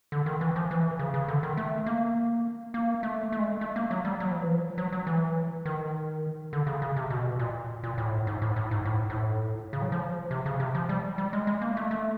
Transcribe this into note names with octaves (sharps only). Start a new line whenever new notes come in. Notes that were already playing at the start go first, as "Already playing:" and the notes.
D3
D#3
E3
F3
E3
C#3
C#3
D3
D#3
A3
A#3
A#3
A3
A3
G#3
A3
A3
A#3
F#3
G3
F#3
F3
E3
F3
F#3
F#3
E3
D#3
D3
C#3
C#3
C3
B2
A#2
A#2
A2
G#2
A2
A2
G#2
A2
G#2
A2
C#3
F#3
F3
C3
C#3
C3
F3
G3
G3
G#3
G#3
A#3
A3
A3